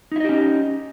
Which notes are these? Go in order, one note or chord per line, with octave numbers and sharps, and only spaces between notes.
C#4 D#4 E4 G4 D#5